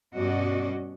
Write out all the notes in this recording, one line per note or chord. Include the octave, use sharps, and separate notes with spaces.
G2 B2 C#4 F#4 D5 D#5